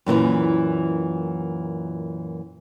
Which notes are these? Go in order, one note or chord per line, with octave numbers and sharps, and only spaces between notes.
F#2 A#2 D#3 E3